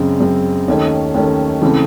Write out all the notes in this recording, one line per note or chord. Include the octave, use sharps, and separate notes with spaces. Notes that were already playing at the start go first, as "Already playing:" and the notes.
Already playing: F#2 C#3 G#3 C4
F#2 C#3 G#3 C4
D#2 D#3 A3 C#4
D#2 D#3 A3 C#4
C#3 E3 A3 C4